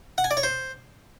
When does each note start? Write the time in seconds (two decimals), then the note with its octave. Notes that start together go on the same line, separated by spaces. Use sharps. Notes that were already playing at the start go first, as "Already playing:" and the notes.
0.18 F#5
0.24 G#5
0.31 D5
0.37 C#5
0.43 C5